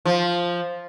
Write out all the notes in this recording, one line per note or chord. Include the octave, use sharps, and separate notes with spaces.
F3